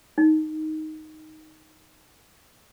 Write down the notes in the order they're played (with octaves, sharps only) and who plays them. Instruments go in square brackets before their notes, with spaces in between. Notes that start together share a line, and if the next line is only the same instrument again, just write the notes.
[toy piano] D#4